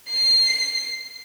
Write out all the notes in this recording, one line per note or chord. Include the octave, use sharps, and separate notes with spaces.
C7